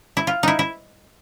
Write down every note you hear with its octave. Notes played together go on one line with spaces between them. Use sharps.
E4
F4
D#4 E4
E4